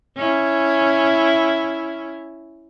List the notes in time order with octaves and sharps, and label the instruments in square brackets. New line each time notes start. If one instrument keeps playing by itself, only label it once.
[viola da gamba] C#4 E4